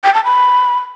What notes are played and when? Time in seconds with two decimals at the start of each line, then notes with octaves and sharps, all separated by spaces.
0.04 G5
0.14 A5
0.24 B5